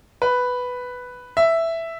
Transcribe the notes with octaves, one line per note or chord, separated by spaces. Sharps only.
B4
E5